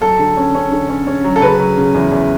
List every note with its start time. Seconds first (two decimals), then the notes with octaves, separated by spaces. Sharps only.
0.01 F#3 A4
0.19 D3
0.37 C#4
0.55 C#4
0.72 D3
0.89 C#4
1.07 C#4
1.24 F#3
1.36 A4
1.41 C#3 B4
1.59 F#3
1.77 C#3
1.94 E2
2.12 E2